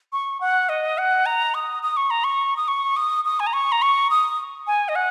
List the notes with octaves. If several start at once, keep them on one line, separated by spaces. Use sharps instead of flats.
C#6
F#5
D#5
F#5
A#5
D#6
D#6
C#6
A#5
C#6
D#6
C#6
D#6
D#6
G#5
A#5
C#6
A#5
C#6
D#6
G#5
D#5
F#5